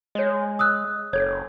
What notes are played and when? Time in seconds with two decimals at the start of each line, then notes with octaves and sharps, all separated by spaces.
0.15 G#3 C#5 D#5
0.59 D#6 E6 F#6
1.13 F#1 A4 C#5 G#6